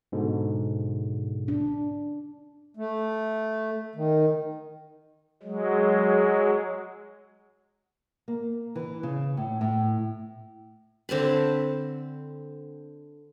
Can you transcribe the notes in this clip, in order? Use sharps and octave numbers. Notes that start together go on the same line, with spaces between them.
G#2 B2 D3
D4
A3
D#3
F#3 G#3
A#3
E3
C#3
A2
A2
D3 C4 A5 B5